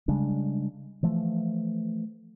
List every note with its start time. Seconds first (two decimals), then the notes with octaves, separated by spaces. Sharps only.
0.08 C#3 G3 G#3 D4
1.03 E3 F3 A3